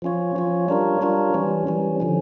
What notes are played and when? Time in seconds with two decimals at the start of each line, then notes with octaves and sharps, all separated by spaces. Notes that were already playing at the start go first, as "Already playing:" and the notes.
0.02 F3 C#4 F4 C#5
0.36 F3 C#4 F4 C#5
0.68 G3 D4 F4 A#4 C#5
1.01 G3 D4 F4 A#4 C#5
1.34 E3 G3 C#4
1.67 E3 G3 C#4
2.00 D3 F3 C#4